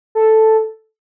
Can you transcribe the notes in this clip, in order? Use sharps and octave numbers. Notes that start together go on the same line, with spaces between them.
A4